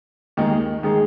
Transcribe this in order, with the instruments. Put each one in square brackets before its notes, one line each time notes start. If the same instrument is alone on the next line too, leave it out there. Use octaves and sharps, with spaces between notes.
[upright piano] D#2 D#3 G#3 D#4 G#4
D#3 G#3 D#4 G#4